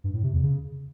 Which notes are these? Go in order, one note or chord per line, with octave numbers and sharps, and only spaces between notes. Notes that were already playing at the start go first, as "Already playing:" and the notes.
G2
A2
C3
E2
C#3